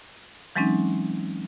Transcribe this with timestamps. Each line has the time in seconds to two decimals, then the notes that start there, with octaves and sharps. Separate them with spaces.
0.56 E3 F#3 G#3 C4 C#4 D#4